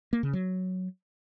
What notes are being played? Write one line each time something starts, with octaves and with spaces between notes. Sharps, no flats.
A#3
C#3
F#3